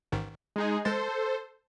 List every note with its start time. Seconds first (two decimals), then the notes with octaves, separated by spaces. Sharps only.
0.12 A1 G#2 D#3
0.56 G#3 D#4 G#4
0.85 G#3 A4 C5 A6